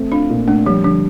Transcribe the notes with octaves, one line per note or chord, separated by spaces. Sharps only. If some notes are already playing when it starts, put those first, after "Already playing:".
Already playing: A3 C4
D4 F4
A#2
A3 D4
F3 G3
D3 F3